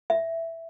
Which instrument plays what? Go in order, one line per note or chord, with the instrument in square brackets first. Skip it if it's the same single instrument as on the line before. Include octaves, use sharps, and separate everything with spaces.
[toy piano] E5